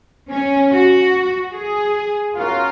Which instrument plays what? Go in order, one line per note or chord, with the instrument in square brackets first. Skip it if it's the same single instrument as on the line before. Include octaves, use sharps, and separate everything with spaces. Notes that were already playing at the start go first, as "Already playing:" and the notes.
[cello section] C#4
F#4
G#4
[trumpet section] C#4 F#4 A#4 F5 [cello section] F4